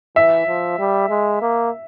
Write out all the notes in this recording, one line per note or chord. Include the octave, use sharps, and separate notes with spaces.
E3 E5
F3
G3
G#3
A#3